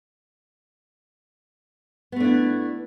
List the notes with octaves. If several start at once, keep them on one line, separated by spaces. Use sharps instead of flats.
A3 B3 D4 E4